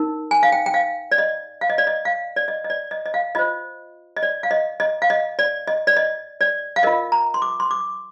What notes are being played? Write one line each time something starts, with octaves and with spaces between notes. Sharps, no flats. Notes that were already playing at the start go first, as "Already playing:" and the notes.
Already playing: D#4 A#4
G#5
F5
G5
G5
F5
D5
D#5
F5
D#5
D5
D#5
F5
D5
D#5
D#5
D5
D#5
D#5
F5
F4 C5 D#5
D#5
D5
F5
D#5
D#5
F5
D#5
D5
D#5
D5
D#5
D5
F5
F4 A#4 D#5
A#5
C6
D6
C6
D6